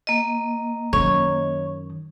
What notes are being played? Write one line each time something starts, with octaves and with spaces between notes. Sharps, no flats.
A#3 D#5
F#2 D#3 C#5